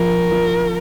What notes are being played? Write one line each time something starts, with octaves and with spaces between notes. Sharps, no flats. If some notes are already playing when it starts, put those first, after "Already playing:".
Already playing: F3 A#4
F3